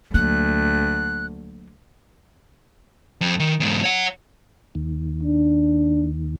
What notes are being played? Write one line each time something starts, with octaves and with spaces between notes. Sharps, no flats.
D2 F#3 A#3 F#6
F2
D#3
E2 G#2
C#5 F#5
D#2
D4